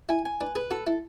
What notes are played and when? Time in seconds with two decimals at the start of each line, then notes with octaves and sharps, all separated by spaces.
0.09 E4 G#5
0.25 G#5
0.40 D4 B4
0.55 G#4 B4
0.71 F#4 A4
0.87 E4 A4